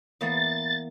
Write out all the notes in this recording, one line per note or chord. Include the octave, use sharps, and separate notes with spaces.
E2 A#3 B3 A6